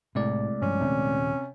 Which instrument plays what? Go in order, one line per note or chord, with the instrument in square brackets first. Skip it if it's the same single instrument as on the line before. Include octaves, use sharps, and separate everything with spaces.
[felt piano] C2 [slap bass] A2 [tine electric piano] G#3 A3 D5
[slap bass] G2 F3 [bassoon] C#4
[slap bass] D#1 [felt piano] C3